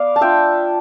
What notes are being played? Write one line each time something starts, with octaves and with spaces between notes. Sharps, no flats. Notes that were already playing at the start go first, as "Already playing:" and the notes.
Already playing: B3 D5 F5
A5
D4 F4 E5 G5